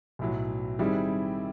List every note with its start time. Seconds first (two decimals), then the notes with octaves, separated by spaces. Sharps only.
0.19 B1 A2 F#3
0.79 D#3 G3 C4 E4 G#4